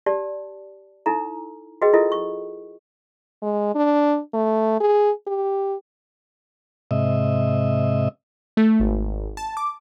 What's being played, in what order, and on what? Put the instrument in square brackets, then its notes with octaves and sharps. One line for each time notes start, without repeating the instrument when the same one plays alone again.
[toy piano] G4 D5 A5
D#4 E4 A4 A#5
F#4 G#4 B4 D#5 G5
E4 F4 A4 A#4 D#5
C#6
[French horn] G#3
D4
A3
G#4
G4
[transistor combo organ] G#2 C3 D#5 E5
[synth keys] A3
G#1
A5
D6